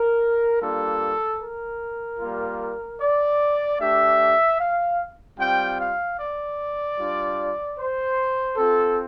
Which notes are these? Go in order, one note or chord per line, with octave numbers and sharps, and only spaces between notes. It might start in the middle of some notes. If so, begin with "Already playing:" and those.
Already playing: A#4
G3 A#3 D4 F4 A4
A#4
G3 A#3 F4
D5
A3 D4 G4 E5
F5
G3 C4 F4 G5
F5
D5
G3 D4 F4
C5
C4 F4 A4